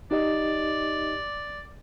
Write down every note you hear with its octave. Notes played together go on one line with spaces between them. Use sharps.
D#4 G4 D5 D#5